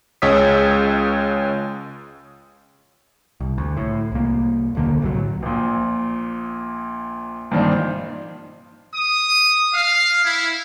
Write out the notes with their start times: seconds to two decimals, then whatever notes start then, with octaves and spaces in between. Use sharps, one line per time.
0.22 C#2 G#3 C#5 D#6 E6 B6
3.40 C2
3.58 D2
3.77 A2
4.12 C2 A#3
4.75 D#1 D3 A#3
5.02 C2 A2 F3 F#3
5.42 A#1 A#2
7.51 A#1 G2 A#2 D#3 D4 C5
8.92 D#6
9.72 F5
10.22 E4